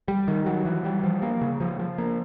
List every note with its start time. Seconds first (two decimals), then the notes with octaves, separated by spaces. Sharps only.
0.08 G3
0.28 D#3
0.46 F#3
0.65 E3
0.84 G3
1.04 F3
1.22 A#3
1.41 C#3
1.60 F3
1.79 F3
1.98 A#3